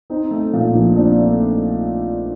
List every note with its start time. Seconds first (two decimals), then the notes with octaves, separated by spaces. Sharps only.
0.10 C4 D#4
0.31 A3
0.53 A#2
0.75 A#1
0.96 C4 D4 D5
1.18 A3